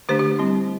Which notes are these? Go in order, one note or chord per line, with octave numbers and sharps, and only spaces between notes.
D3 A3 D4 G4 C5
G4
G3 C4 E4